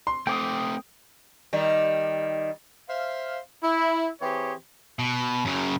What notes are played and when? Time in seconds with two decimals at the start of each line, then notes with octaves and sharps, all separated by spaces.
0.07 C6
0.27 A3 C4 G5 D6 D#6
1.53 D#3 G3
2.88 C5 E5 F5
3.62 E4
4.22 E3 C4 G4 G#4 C#5
4.99 B2
5.45 F#2 C#3